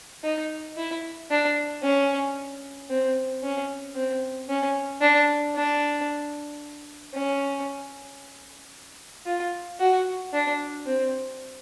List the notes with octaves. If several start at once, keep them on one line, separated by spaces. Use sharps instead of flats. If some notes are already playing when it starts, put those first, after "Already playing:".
D#4
E4
D4
C#4
C4
C#4
C4
C#4
D4
D4
C#4
F4
F#4
D4
C4